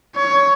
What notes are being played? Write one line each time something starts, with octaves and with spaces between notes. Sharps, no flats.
C#5